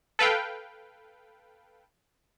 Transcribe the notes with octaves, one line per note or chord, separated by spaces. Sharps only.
A4 B4 F5 G5